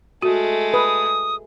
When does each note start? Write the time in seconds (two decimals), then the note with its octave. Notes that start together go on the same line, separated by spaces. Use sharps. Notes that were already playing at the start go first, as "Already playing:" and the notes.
0.22 G#3 A3 F#4
0.74 B4 D#6